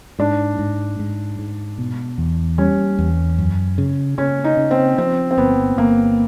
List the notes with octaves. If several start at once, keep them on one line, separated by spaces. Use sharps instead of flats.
G#2 D4
G#2
G#2
G#2
B2
E2
G3 C#4
E2
F#2
C#3
C#3 C#4
D#4
C#3
C4
F3 C4
C4
G1 B3
G1 A#3